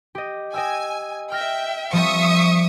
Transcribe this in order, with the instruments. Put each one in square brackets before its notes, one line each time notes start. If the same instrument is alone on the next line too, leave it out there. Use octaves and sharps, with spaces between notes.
[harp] G4 D#5
[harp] D#5 G5 E6 [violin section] G#5
[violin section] E5 G5 [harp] F6 A#6
[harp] F3 G3 C4 [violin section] E5 C#6 D#6